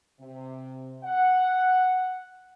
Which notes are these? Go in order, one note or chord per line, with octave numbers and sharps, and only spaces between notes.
C3
F#5